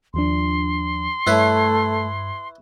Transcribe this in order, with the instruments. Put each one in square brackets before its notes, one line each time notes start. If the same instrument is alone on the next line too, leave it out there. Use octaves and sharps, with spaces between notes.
[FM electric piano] D#2 F3 D4 [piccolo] C6
[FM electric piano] G2 B5 G#6 [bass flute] A3 [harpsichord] E4 B4 C#5